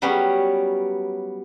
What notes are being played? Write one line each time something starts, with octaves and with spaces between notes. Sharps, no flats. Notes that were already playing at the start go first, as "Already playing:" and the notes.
F#3 G3 B3 C#4 G4